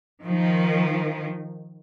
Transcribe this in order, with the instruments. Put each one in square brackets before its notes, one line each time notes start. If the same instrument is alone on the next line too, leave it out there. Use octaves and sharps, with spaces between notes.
[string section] D#3 F3